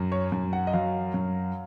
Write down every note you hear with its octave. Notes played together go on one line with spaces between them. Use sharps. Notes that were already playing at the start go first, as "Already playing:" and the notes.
Already playing: F#2
C#5
F#2
F#5
D#5
F#3 F5
F#2